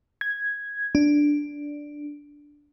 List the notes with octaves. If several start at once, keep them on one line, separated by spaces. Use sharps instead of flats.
G#6
D4